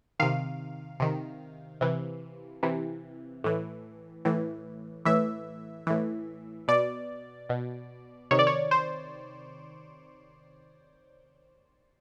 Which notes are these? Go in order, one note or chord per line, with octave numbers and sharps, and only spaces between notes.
C3 D#3 F5
C3 D#3
C3 E3
C3 E3
A2 E3
A2 E3
A2 E3 E5
A2 E3
B2 D5
B2
C3 D#3 C#5
D5
C#5
C5